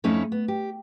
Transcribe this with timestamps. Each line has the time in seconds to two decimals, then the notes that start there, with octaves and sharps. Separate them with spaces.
0.04 F2 A3 C#4 D#4 E4
0.32 B3
0.48 G4